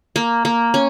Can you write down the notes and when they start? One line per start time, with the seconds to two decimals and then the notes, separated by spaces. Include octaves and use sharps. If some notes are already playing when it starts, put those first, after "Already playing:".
0.16 A#3
0.45 A#3
0.74 C#4